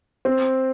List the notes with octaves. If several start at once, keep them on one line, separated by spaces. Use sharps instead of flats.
C4